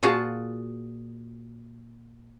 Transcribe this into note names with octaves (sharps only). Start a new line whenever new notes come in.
A#2 F4 F#4 G#4 A5